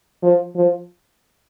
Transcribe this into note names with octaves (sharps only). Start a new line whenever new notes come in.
F3
F3